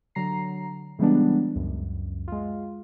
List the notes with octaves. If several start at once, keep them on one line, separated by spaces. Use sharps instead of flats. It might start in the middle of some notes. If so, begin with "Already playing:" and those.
D3 F#3 A#5 C7
C#3 E3 G3 G#3 B3 D4
C#2 F#2
G#3 F4